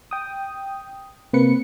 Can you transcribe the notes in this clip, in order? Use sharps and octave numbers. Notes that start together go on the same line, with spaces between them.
G5 D#6
C3 A#3 C4 B4 C#7